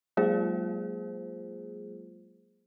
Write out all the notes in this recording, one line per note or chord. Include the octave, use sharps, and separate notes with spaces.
F#3 G#3 A#3 F4 G#4 C5